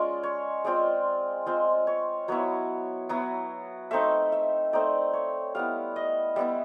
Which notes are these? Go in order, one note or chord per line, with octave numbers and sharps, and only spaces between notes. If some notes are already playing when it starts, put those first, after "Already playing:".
Already playing: G#3 C#4 F4 D5
C#5
G#3 C4 F4 D5
G#3 C4 F4
C#5
F#3 B3 E4 C#5
F#3 B3 E4
A3 C4 D#4 E5
E5
A3 C4 D#4 D5
C#5
G3 B3 E4 F5
D#5
G3 B3 E4 E5